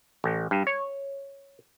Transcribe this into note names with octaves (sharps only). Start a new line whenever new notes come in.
A1
G2
C#5